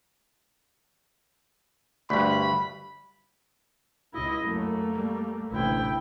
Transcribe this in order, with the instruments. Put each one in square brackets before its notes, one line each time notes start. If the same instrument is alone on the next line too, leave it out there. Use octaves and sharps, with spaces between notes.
[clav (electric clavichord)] D2 G2 [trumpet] B5
[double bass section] C#2 [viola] E4 D#5
[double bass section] F#2 [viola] A3 A#3
[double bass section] G3
[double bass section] A1 D2 C3 [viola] E4 G5